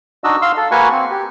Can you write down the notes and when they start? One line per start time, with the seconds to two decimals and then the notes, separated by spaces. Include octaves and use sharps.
0.24 D4 D#4 F#4 D#5 E6
0.42 F5 C6 E6
0.57 A4
0.71 A#3 F#4 B4 G#5 C#6
0.91 C4
1.10 G4